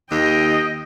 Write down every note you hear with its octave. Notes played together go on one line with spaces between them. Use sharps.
D#2 D#5 G5